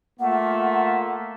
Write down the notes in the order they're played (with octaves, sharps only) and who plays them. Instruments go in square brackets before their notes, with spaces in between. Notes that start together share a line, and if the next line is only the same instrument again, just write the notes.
[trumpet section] A3 A#3 F4 [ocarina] F#5